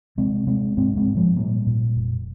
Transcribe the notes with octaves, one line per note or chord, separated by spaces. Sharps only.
C3 G#3 C4
C3 G#3 C4
G#2 G#3 C4
G#3 C4
G#2
F3 G#3
A#2 G3 A#3
A#2
F1